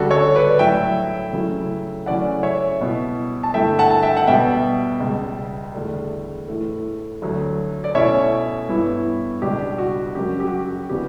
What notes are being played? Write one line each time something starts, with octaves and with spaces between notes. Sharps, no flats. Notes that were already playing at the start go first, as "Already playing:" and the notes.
Already playing: D2 C#3 G3 D4 F#4 A4
A4 C#5
B4 D5
A2 F#3 A3 E4 E5 G5
C#3 F#3 A3 E4
C#3 F#3 A3 C#4 E4 D5 F#5
C#5 E5
B2 G3 B3 E4
A5
G2 D3 A3 E4 E5 G5
F#5 A5
A5
E5 G5
F#5
B2 G3 B3 E5 G5
C#2 B2 G3
E2 D3 A3 D4
A2 E3 A3
D2 D3 F#3 A3
D5
B2 A3 C#4 E4 C#5 E5
G2 E3 B3 E4
C#2 B2 G3 D4 G4
F#4
F#2 C#3 F#3 G4
G4
F#4
G4
C#3 E3 B3 D4 G4